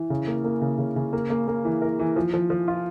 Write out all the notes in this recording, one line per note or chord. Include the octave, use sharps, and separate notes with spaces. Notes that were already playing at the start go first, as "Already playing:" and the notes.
Already playing: E3
C#3
A#3
A#3
C#3
C#3
C#3
A#3
A#3
A#3
E3
A#4
E3
F3
F3
F3
F4